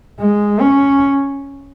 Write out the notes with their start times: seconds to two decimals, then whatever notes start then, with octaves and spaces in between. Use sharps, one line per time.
0.20 G#3
0.60 C#4